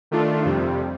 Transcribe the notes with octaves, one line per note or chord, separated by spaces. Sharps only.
D#3 A3 D4 F4
F2 C3 G3